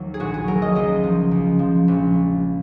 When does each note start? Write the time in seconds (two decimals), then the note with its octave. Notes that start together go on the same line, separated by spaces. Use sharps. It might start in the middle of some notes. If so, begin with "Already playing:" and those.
Already playing: D#2 D#3 F#3
0.14 G#4
0.19 A#1 F#4
0.34 G#4
0.48 F#3 A#4
0.62 D#5
0.75 C#2 D#5
1.03 F3
1.31 C#2
1.59 F3
1.88 A#1